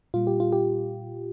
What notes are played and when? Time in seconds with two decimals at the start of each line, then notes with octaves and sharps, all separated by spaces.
0.14 A#2 G3 F4
0.27 G4
0.40 F4
0.53 G4